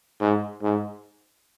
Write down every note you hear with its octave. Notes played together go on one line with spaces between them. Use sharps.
G#2
G#2